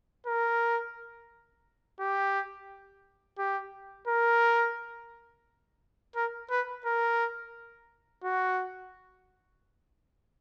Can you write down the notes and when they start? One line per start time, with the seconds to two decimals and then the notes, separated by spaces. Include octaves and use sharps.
0.27 A#4
2.00 G4
3.38 G4
4.08 A#4
6.16 A#4
6.51 B4
6.86 A#4
8.24 F#4